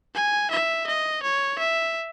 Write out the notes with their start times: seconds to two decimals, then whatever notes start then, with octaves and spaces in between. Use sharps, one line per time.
0.15 G#5
0.51 E5
0.87 D#5
1.23 C#5
1.59 E5